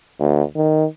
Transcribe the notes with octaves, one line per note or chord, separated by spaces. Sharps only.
D2
D#3